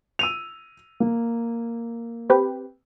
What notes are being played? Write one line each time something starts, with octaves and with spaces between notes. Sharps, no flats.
E6 D#7 F7
A#3
C4 G4 B4